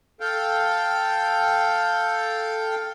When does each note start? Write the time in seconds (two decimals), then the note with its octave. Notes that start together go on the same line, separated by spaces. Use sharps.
0.20 A4 F5 G5